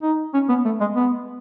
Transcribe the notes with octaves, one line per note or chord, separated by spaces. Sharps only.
D#4
C#4
B3
A3
G#3
B3